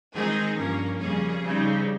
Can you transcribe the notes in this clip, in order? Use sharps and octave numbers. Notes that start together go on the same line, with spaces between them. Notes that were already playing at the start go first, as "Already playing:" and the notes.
D#3 G#3 C4 D#4 G#4
G2 F3 A#3 C#4 A#4
F2 C#3 G3 A#3 C#4 G#4
C#3 G3 C4 D#4